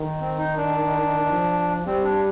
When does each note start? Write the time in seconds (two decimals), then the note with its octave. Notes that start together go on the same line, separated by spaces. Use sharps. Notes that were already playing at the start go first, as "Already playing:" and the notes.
Already playing: D#3
0.21 C4
0.39 D#4
0.57 D4
1.31 F3
1.86 G3 C4
2.04 D4